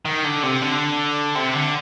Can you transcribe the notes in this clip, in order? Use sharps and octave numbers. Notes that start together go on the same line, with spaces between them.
D#3
D3
C3
D3
C3
D3